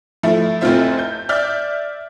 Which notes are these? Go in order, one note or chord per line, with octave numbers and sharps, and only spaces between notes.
F3 A3 E4
F1 A2 C4 F4 C5 E5
G6
D5 E5 F6 G6 A6